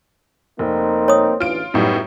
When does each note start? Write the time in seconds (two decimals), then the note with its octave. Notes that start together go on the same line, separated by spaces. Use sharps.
0.59 F1 A#3 C4 D#4
1.08 C#5 D#6
1.40 A1 D2 E3 F4 D7
1.74 F#2 A2 G3 B3 D#4